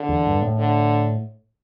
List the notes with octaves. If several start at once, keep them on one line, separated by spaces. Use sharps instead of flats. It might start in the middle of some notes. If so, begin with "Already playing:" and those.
Already playing: D3
E2
G2
A2
D3